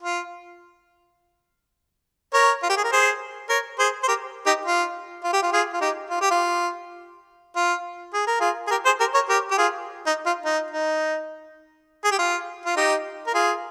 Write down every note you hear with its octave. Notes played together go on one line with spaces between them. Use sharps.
F4
A#4 C#5
F4
G4
G#4
A#4
G#4 C5
A#4 C#5
G#4 C5
C5
G4 A#4
D#4 G4
F4
F4
G4
F4
F4 G#4
F4
D#4 G4
F4
G4
F4
F4
G#4
A#4
F4 G#4
G#4
G4 A#4
G#4 C5
G4 A#4
A#4 C#5
G4 A#4
G4
F4 G#4
D#4
F4
D#4
D#4
G#4
G4
F4
F4
D#4 G4
A#4
F4 G#4